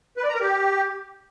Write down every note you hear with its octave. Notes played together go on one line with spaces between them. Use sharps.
B4
D5
A#5
A#4
G4